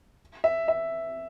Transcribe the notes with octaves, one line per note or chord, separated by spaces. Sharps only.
E5
E5